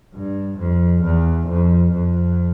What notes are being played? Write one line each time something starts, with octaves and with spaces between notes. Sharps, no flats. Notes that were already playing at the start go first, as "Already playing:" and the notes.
G2
F2
E2
F2
F2